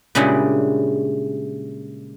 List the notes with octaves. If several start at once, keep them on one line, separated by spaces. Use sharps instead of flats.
A#2 C#3 G3 G#3 D4 E4